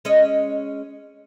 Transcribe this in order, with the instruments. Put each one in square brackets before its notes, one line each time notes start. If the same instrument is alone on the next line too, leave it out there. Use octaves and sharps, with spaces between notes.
[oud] G#3 C#4 D#5